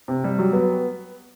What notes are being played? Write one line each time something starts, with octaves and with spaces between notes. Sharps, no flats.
C3
G3
F#3
B3